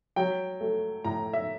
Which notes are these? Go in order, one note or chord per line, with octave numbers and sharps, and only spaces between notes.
F#3 G5
A3
A2 A#5
E5